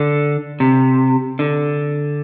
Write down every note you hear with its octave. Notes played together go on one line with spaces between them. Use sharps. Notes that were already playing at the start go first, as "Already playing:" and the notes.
Already playing: D3
C3
D3